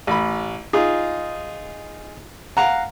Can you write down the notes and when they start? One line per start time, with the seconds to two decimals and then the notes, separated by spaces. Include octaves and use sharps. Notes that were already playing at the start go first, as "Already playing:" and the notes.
0.07 A1 B5
0.73 D#4 F4 G#4
2.57 F5 F#5 A#5